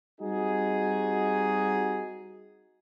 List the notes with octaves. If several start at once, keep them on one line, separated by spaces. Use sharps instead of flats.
G3 C4 D#4 F#4 G#4